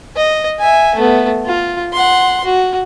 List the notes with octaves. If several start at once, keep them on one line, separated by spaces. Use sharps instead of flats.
D#5
E5 G#5
A3 B3
F4
F#5 C6
F#4